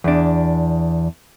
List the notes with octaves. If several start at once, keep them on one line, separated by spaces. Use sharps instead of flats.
E2 D4